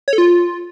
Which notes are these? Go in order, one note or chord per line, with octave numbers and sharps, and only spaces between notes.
C#5
A4
F4